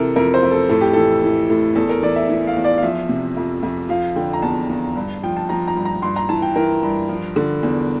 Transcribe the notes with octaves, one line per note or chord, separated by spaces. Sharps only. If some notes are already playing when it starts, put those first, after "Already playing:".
Already playing: C3 E3 A4 A#4
F2 A#4
C5
F2
A4
A2 A4
G4
E3 A4
E3
A2
E2 A4
A#4
E3 D5
E5
E3
F5
E2
D5
F5
F3 E5
C3
F2
F2
F3 F5
D3 G5
A#5
E2 A5
E2
G2
F3 G5
A5
F3 A#5
A#5
G2
A#5
G2 C6
A#5
E3 A5
G5
E3 A#4
G2
F3
D3
E2